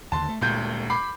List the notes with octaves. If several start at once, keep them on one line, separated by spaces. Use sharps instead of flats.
D#2 D3 A5 C6
A3
D#1 D2 A#2 G#3 G6
B5 D6 C7